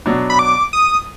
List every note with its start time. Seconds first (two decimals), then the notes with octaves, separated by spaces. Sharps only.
0.06 B2 F#3 D4
0.30 B5
0.39 D6
0.73 D#6